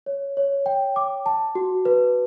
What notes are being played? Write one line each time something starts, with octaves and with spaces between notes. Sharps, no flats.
C#5
C#5
G5
D6
A5
F#4
B4